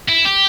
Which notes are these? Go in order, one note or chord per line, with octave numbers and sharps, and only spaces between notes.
E4
G4